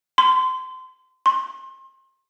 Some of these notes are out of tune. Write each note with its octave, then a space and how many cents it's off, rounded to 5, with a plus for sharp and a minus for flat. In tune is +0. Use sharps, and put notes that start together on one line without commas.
C6 -25
C6 +35